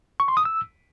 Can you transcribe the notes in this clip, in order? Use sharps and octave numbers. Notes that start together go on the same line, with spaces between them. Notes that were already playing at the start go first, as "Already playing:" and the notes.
C#6
C6
D#6
E6